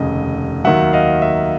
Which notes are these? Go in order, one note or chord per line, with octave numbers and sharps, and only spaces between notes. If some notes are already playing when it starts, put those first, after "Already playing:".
Already playing: F1 D#2 C#3 D#5
D#2 D#3 F#3 E5 F#5
D#5 F5
E5